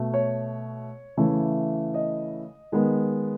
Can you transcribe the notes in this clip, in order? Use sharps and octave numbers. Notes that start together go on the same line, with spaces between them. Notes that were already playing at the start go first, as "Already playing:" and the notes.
Already playing: B2 A3
C#5
C#3 E3 A3
D#5
D#3 G#3 B3